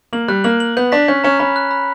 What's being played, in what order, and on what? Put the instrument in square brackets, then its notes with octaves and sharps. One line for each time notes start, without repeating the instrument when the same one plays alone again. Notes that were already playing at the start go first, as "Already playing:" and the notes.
[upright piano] A#3 [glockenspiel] F#7
[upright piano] G3 [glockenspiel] F#6
[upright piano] A#3 [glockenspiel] F#7
[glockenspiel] F#7
[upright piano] B3 [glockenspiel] G6
[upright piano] D4 [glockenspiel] B6
[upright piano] C#4 [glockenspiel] G6
[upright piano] C#4 [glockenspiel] A#5
[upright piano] C#4 [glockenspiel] B5
[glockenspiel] F#6
B5